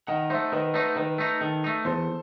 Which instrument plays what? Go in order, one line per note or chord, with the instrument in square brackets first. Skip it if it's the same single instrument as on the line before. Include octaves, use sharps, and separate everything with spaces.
[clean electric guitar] D#3 [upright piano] D#5 F#5
[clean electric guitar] A3 D#4 [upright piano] C5 E5
[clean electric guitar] D#3 [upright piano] B4 D#5
[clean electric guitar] A3 D#4 [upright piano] B4
[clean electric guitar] D#3 [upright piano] B4
[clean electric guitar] A3 D#4
[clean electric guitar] D#3 [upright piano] A4
[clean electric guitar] A3 D#4
[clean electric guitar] E2 [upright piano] A4 C5